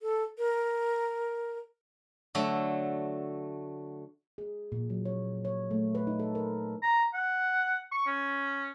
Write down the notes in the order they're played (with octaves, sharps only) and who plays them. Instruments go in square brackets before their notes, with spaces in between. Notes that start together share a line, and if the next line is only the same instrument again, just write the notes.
[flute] A4
A#4
[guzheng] D3 F#3 A3
[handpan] G#4
A#2
F#3
C#5
C#5
A3
B4
D#4
A4
A#4
[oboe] A#5
F#5
C#6
C#4